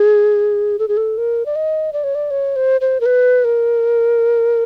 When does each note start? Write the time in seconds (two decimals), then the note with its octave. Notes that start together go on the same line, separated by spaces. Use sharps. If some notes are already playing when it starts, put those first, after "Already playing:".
Already playing: G#4
0.79 A4
0.88 G#4
0.97 A4
1.18 A#4
1.46 D5
1.56 D#5
1.93 D5
2.04 C#5
2.15 D5
2.31 C#5
2.56 C5
2.81 C5
3.01 A#4
3.06 B4
3.44 A#4